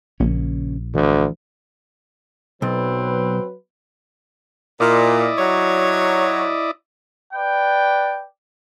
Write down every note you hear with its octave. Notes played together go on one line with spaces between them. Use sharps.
A#1 C#3 A#3 C#4
D2 E3
B1 F#3 C4 B4
A#2 E4 D5 D#5
F#3 C#5
B4 D5 G5